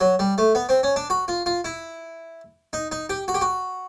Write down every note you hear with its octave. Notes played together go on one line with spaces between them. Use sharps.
F#3
G3
A3
B3
C4
C#4
D4
F#4
F4
F4
E4
D#4
D#4
G4
F#4
G4
F#4